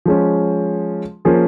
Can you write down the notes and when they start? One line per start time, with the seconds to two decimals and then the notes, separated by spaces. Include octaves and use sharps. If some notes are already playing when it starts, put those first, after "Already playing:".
0.06 F3 G#3 C#4
1.25 F3 A#3 C#4 F4 G#4